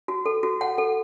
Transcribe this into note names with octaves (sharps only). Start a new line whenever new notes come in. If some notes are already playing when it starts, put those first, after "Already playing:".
F#4
A4
F#4
F#5
A4